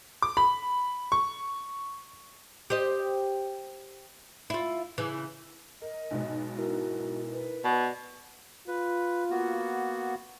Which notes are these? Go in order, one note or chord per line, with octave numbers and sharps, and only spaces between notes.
D6
B5
C#6
G4 C5 D#5
E4 F4
C#3 E3
A#4 D#5
B1 G#2 B2
E4 F#4 A#4
B4
B2 D5
F4 B4
A#3 B3 F#4